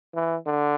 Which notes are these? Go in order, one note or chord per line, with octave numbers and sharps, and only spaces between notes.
E3
D3